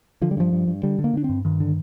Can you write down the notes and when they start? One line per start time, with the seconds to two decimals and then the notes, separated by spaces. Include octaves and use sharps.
0.22 D3 F3
0.31 G3
0.37 G2 F3
0.53 G2
0.68 G2
0.83 D3 G3
0.99 D3
1.04 A#3
1.14 D3 D4
1.24 C4
1.29 G2
1.45 G2 D#3
1.60 D3